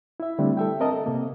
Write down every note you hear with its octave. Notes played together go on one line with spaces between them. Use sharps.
E4 E5
D3 G3 A3 C4 D4
A4 E5 G5
C4 A#4 D#5 A5
A4
C3 A#3